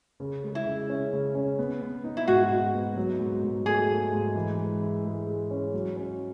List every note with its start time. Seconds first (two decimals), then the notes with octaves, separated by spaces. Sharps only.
0.20 C#3
0.43 G#3
0.55 E4
0.66 C#3
0.89 C#4
1.13 C#3
1.35 C#4
1.59 B3
1.82 B3
2.04 D#4
2.17 E4
2.28 G#2 F#4
2.51 D#4
2.74 B3
2.96 F#3
3.20 G#2
3.43 G#2
3.66 A3 G#4
3.89 G#2
4.12 G#2
4.35 E3
4.58 G#3
4.82 E4
5.05 G#3
5.27 G#3
5.51 C#4
5.74 F#3
5.97 C#4